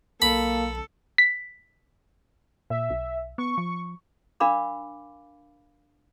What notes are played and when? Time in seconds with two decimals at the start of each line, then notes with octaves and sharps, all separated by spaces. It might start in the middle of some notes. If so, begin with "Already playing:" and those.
0.22 B1 A#3 A4 B5
1.18 B6
2.70 A#2 E5
2.90 B1
3.38 B3 C#6
3.58 F3
4.40 D4 A#4 F5 B5 D6